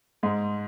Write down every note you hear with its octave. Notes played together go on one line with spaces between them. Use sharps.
G#2 G#3